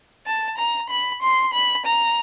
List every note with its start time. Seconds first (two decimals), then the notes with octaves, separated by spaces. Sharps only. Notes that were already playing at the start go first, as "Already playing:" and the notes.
0.26 A5
0.58 A#5
0.90 B5
1.22 C6
1.53 B5
1.86 A#5